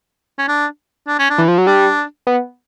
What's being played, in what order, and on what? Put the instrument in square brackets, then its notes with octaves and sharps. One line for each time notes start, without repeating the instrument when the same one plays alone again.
[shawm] C#4
D4
D4
C#4
D4
[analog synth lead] E3
F3
F#3
[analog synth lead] G3 [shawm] D4
[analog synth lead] B3